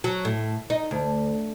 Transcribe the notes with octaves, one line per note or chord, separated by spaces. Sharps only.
F#3
A2
D#4
D2